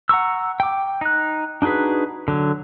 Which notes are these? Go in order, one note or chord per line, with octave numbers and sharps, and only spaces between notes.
F#5 A#5 C#6 E6
G5 D6
D#4 F#6
D4 D#4 F#4 G#4 B4
D3 F#3